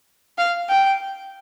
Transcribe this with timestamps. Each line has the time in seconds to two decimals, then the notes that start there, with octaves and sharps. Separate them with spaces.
0.38 F5
0.69 G5